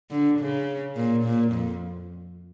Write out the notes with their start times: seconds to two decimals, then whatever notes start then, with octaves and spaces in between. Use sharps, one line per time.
0.10 D3
0.39 C#3
0.96 A#2
1.24 A#2
1.52 F2